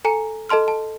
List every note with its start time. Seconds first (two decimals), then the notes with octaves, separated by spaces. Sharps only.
0.05 A4 G#5 A#5 C#7
0.49 A4 D#5 A5 C6 F6
0.68 A5